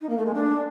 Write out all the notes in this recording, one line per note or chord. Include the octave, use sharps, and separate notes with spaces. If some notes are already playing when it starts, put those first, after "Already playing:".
D#4
A#3
A3
G#3
D4